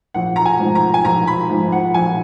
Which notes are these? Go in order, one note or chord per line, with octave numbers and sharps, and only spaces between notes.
A#1 F#5
A#5
G#5
G#2 F3
A#5
G#5
A#1 A#5
B5
G#2 F3
F#5
A#1 G#5